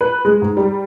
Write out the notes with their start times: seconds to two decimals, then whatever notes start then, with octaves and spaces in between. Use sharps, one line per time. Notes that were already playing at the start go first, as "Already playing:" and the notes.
0.01 B4
0.25 G#3
0.42 G#2
0.57 G3